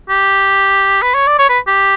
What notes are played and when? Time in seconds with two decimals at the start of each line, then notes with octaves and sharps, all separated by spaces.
0.09 G4
1.02 B4
1.14 C#5
1.27 D5
1.39 C#5
1.49 B4
1.67 G4